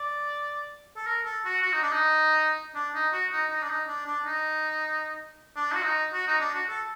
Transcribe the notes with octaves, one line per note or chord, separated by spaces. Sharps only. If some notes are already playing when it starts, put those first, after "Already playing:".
Already playing: D5
A4
A#4
A4
F#4
F#4
D#4
D4
D#4
D4
D#4
F#4
D#4
D#4
D4
D#4
D4
D4
D#4
D4
F#4
D#4
F#4
D#4
D4
F#4
A4